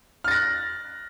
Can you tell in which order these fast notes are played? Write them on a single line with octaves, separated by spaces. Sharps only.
F6 A6 A#6 F#6